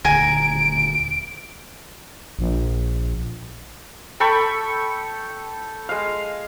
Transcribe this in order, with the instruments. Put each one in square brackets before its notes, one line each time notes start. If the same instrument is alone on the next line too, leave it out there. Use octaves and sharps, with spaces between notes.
[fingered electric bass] D#1 D2 [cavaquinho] G#5 A#5 [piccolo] D7
[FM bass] A#1
[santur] A4 G5 B5 C#6
G#3 F5